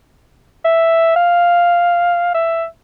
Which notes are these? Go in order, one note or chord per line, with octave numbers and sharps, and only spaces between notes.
E5
F5
E5